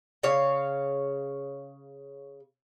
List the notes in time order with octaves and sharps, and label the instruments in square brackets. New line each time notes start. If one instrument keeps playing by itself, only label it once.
[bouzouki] C#3 C#5 F5